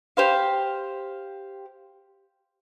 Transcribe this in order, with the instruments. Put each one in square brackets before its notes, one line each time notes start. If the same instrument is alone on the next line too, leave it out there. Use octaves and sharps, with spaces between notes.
[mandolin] G4 C5 F5